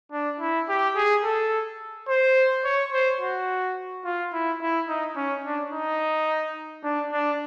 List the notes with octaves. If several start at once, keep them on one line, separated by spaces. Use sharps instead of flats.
D4
E4
G4
G#4
A4
C5
C#5
C5
F#4
F4
E4
E4
D#4
C#4
D4
D#4
D4
D4